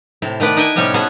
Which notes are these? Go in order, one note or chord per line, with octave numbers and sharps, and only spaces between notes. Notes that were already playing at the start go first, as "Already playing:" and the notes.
A2 C3 E4
D#3 A3 B3 B4 D5
D#4 E4 B4 G5 G#5
A2 C3 G3 B3 C#4 C#5
B3 F#4 G#4 A4